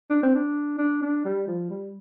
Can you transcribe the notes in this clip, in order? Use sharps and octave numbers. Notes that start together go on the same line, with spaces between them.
D4
C4
D4
D4
D4
G3
F3
G3